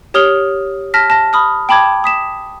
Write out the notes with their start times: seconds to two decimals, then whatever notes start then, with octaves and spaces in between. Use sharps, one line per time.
0.14 G4 C#5 D#6 F6 F7 G7
0.94 A5 F6 A#6 B6
1.10 A5 A#6
1.33 B5 D#6 F6
1.69 G5 A5 B5 D6 G#6
2.04 D#6 B6 E7